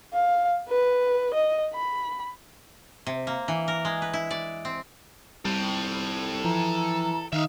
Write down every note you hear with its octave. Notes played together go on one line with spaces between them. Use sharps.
F5
B4
D#5
B5
C3
A#3
E3
A#4
G#3
B4
E4
D5
C4
C2 G3 A4 G5
E3 F3 A#5
D#3 D#4 E5 F5